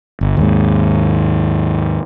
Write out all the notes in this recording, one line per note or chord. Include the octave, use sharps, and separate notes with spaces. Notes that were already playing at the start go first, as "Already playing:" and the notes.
G1
D#2 G#2